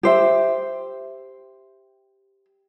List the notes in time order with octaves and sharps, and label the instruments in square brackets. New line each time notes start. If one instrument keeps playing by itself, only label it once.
[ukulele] G4 C5 E5